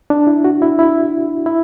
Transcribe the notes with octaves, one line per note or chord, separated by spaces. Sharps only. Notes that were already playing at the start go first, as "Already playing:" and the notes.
D4
E4
F#4
E4
E4
E4